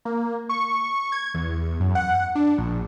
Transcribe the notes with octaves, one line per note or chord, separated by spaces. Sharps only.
A#3
C#6
G#6
E2
F#2
F#5
D4
A#1